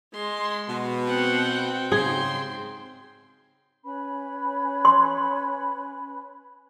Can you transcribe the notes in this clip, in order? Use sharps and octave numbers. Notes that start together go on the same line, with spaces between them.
G#3 C6
B2
C4 F#5 G5
G#2 C#3 G#4 C6
C#4 B4 B5
C6